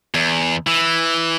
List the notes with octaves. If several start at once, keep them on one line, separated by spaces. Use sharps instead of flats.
E2
E3